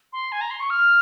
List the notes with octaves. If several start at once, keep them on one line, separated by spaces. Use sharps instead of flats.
C6
G#5
A#5
C6
C#6
F6